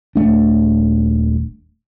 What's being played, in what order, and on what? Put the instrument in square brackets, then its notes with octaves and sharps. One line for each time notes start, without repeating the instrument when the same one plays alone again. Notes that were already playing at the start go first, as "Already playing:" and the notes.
[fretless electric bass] D#1 A3 D4